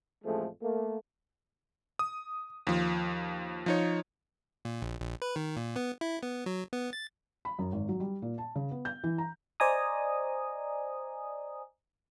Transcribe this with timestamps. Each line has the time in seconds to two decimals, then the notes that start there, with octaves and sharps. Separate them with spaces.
0.24 A1 F2 F3 G#3 A3
0.61 A3 A#3
1.99 D#6
2.67 D#2 F3
3.66 F3 D#4 C#5
4.65 A#2
4.82 A#1
5.00 A#1
5.22 B4
5.36 D#3
5.57 A#2
5.76 B3
6.01 E4
6.23 B3
6.46 F#3
6.73 B3
6.93 A6
7.45 B5
7.59 F#2
7.72 G#1
7.89 F#3
8.00 G3
8.22 A#2
8.38 A5
8.55 C#3
8.71 B3
8.85 G6
9.03 E3
9.18 A#5
9.60 C5 D5 D#5 G#5 A#5 D#6